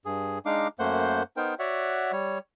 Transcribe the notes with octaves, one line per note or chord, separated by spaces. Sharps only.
G2 G#4
G#3 D4 D#4 F5 D6
F#2 A3 A#3 C5 F#5 G6
B3 D#4 A#4 C5 G5
F#4 C#5 D5 E5 F#5
G3 C#5